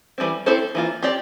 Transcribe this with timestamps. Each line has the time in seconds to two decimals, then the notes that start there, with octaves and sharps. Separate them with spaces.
0.18 E3 G3 C4
0.46 C4 E4 A4 C5
0.75 E3 A#3 F4
1.02 C4 G4 D5